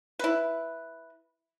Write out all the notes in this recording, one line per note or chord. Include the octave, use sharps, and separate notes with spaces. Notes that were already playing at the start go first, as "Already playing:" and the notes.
E4 B4